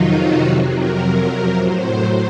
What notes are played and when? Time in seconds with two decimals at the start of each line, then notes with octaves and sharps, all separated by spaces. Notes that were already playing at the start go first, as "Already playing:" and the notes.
Already playing: F2 C3 D#3 F#3 D#4 F4
0.13 F#4
0.41 F2 C3 F#3 F#4
0.70 A#4
1.55 A2 F#3 C5